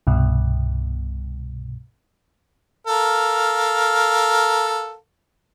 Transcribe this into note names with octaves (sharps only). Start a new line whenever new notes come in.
C2 G2 B2
A4 A#4 F5